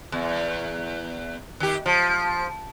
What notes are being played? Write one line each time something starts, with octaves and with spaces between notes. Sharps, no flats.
E2
D#3 G4
F3